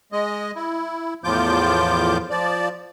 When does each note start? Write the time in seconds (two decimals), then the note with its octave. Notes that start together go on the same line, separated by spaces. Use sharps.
0.12 G#3 D#5
0.55 E4
1.24 E2 A2 F3 F4 D6 G6
2.30 F3 D5